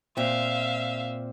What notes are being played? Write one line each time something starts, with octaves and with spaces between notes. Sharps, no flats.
A#2 C4 E5 F5